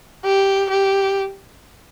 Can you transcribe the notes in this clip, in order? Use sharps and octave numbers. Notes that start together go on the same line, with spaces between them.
G4
G4